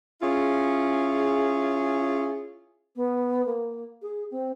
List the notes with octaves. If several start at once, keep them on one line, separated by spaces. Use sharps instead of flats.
C#4 E4 F4 G#4
B3
A#3
G#4
C4